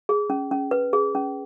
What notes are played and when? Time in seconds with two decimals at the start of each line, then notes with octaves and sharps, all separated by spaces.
0.09 G#4
0.30 C#4
0.51 C#4
0.71 B4
0.93 G#4
1.15 C#4